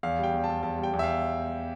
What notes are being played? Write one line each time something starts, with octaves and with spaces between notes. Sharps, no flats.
E2 F5
G3 G5
E2
A5
E2
E2 A5
G3
G5
E2
E5
F5